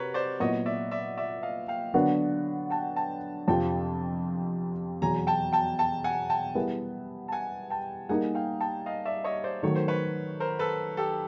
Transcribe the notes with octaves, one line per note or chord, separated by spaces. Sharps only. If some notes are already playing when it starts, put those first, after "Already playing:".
Already playing: C3 F#4 A#4 B4 C#5
C5 D5
A#2 F#3 B3 E4 C#5 D#5
D5 E5
D5 E5
D5 E5
D#5 F5
F5 G5
D3 F#3 B3 D4 F#4
G5 A5
G5 A5
F2 C3 F3 G5 A5
E2 B2 F#3 G#5 A#5
G5 A5
G5 A5
G5 A5
F#5 G#5
G5 A5
G3 B3 E4 G#4 B4
A5
F#5 G#5
G5 A5
G3 A#3 D#4 G#4 F#5 G#5
F5 G5
G5 A5
D#5 F5
D5 E5
C#5 D#5
C5 D5
D#3 F#3 A3 C#5
C5
B4 C#5
A#4 C5
A4 B4
G4 A4